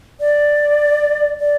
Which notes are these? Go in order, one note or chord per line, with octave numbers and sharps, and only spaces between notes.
D5
D5